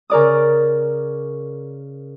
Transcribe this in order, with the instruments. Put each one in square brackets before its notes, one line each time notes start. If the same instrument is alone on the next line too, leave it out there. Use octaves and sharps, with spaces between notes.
[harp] C#3 A#4 D5 D#6